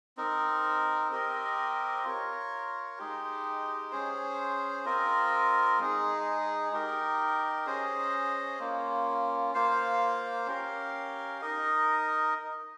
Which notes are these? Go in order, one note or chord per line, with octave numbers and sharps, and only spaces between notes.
C4 D#4 A#4
C4 G4 A#4 D#5
F4 A#4 C#5
G#3 D#4 G4
C#4 G#4 C5
C4 F4 A#4 D#5
G#3 D#4 G#4
D#4 G4 A#4
C#4 G#4 C5 D#5
A#3 C#4 F4
A#3 F4 C5 F5
C#4 G4 A#4 F5
D#4 A#4 D#5